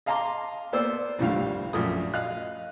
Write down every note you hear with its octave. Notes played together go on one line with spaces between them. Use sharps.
D#5 F5 A5 A#5 C6 D6
A#3 B3 C5 D5 E6
C2 F2 A2 D3 G3 F5
A#1 F#2 A3 D#6
D#5 F5 F#6